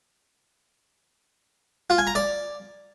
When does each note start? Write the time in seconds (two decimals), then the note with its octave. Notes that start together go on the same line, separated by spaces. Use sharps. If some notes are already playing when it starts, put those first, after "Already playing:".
1.90 F4
1.98 G#5
2.07 A#5
2.15 D5